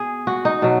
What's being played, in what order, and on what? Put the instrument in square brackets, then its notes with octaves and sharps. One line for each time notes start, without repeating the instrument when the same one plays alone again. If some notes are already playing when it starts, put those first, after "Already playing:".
Already playing: [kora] B2 G#4
F#4
D#4
B2 F#3